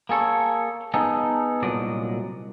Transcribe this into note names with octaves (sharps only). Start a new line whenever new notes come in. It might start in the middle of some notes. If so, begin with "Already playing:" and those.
A#3 G#4 A4 C#5
B3 D#4 G#4 A4
C2 A#2 F#3 D5 D#5